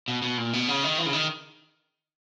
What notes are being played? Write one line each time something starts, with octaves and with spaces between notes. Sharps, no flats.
B2
B2
A#2
B2
C#3
D#3
E3
C#3
D#3